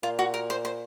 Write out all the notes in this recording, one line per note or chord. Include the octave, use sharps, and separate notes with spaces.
A#2 F4
F#4
A#4
C5
C5